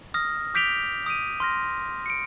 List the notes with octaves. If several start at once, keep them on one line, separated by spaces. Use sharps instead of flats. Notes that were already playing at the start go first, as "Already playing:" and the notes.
D#6 F6 A#6
D6 G6 B6 D7 F7 G7
D#6 D7 D#7
C6 F6 A#6
C#7 D7